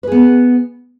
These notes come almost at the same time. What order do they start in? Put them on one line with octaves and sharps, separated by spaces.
B4 G#4 B3